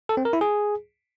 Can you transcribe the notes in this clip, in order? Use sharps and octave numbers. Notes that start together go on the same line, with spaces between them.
A4
C4
A#4
E4
G#4